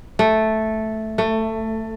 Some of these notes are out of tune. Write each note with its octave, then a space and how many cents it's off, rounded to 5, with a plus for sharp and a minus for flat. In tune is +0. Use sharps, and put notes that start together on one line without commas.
A3 -5
A3 +15